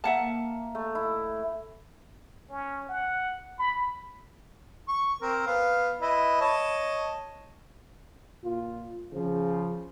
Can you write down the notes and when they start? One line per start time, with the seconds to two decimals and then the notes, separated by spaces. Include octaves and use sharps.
0.04 A#3 E5 F#5 A5
0.75 A3
0.95 E4
2.50 C#4
2.89 F#5
3.59 B5
4.88 C#6
5.22 C4 A#4
5.47 B3 F5
6.01 E4 B4 D#5
6.41 C#5 D#5 A5
8.43 A#2 F4
9.12 C#3 F3